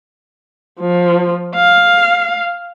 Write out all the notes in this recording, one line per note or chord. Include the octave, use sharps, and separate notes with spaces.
F3
F5